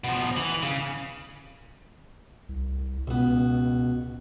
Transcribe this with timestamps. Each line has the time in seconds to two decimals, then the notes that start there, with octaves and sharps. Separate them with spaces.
0.04 B2 F3
0.37 E3
0.63 C#3
2.49 C2
3.08 C#2 B2 B3